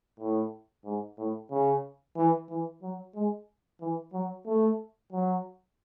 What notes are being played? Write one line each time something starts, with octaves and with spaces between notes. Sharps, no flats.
A2
G#2
A2
C#3
E3
E3
F#3
G#3
E3
F#3
A3
F#3